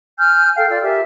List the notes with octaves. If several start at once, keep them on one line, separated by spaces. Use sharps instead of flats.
G#5 F6 G6
A4 F5 G5
F4 D5 E6
G4 A#4 E5 G#5